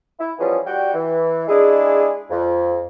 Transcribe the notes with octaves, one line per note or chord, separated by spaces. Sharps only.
E4
E3 F3 G3 B3 C#4 G#4
G3 F#4 G5
E3
G#3 D4 E4 G#4
F2